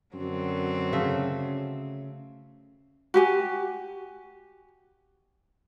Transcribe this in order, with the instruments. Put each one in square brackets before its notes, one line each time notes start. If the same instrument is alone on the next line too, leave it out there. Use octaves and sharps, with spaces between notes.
[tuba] F#2 [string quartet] D3 F#3 C4
[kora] C#3 A3 E5
[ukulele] F#4 G4 G#5